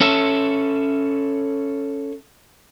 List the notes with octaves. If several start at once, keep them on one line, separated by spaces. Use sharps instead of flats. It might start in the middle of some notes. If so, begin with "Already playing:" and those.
C#4 A4 E5